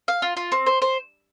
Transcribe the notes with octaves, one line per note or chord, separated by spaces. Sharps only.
F5
F4
F4
C4
C5
C5